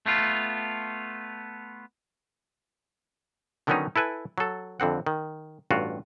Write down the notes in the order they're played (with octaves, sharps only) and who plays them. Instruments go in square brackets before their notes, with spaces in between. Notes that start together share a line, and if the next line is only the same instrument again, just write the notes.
[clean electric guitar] A3 B3 F4
[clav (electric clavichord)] D3 D#3 F#3 B3 C#4 D#4
E4 A4 B4 G#5
F#3 A4
F2 D3 C4 F#5
D#3
A1 G2 F4 F#4